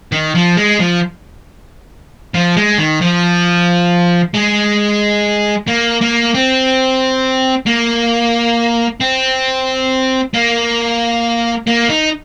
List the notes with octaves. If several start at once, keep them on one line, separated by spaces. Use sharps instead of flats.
D#3
F3
G#3
F3
F3
G#3
D#3
F3
G#3
A#3
A#3
C4
A#3
C4
A#3
A#3
D#4